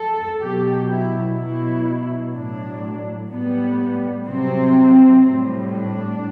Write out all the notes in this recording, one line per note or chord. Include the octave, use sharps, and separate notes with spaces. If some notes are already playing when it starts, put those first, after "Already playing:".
Already playing: A4
B2 F#3 G4
E4
B2 F#3 E4
A2 F#3 D4
A2 G3 B3
C3 F#3 C4
A2 G3
D4